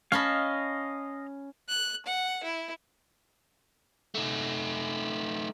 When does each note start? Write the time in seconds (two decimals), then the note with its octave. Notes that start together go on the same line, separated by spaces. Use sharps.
0.12 C#4 D#5 F5 A5 B5
1.68 F#6
2.06 F#5
2.44 E4
4.15 A3 D#4